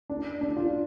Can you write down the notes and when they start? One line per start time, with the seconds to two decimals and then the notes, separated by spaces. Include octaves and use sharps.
0.10 D4
0.41 D4
0.57 F4